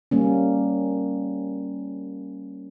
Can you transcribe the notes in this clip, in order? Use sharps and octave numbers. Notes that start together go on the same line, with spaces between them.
G3 A#3 C#4